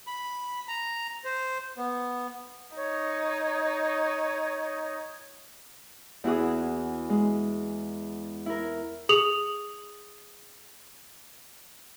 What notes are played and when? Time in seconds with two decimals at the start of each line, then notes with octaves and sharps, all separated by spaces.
0.07 B5
0.68 A#5
1.25 C5
1.78 B3
2.77 D#4 C#5
6.24 E2 E4 F#4 G#4 D#6
7.10 G#3
8.46 E4 A#4
9.09 G#4 D#6 F7 F#7